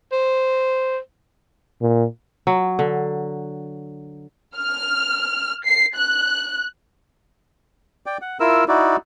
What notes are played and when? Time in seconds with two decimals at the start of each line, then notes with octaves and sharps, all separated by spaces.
0.12 C5
1.81 A#2
2.47 F#3
2.79 D3
4.57 F6
5.65 C7
5.96 F#6
8.06 D5 G5
8.22 F#5
8.40 E4 F4 A#4 E6
8.68 D#4 E4 F#4 D5